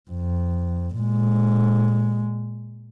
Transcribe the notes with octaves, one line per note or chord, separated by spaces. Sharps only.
F2
A#2 G#3